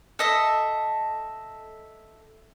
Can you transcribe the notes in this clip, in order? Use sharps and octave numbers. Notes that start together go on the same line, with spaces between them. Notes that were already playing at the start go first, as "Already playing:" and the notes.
A4 D#5 E5